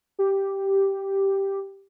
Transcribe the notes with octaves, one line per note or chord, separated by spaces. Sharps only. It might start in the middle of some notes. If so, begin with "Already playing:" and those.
G4